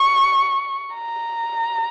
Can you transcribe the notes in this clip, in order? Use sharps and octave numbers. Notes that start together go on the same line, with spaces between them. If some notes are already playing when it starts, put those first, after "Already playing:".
Already playing: C#6
A#5